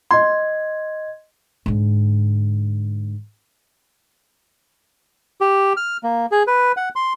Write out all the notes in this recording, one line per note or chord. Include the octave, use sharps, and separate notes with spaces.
D#5 C6 G#6
G#2 D3
G4
F6
A#3
G#4
B4
F#5
C6